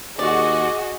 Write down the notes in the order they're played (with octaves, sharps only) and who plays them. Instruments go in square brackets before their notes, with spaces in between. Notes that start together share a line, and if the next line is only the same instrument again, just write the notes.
[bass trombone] D#2 [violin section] F#4 G#4 [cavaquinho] D5 [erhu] D#5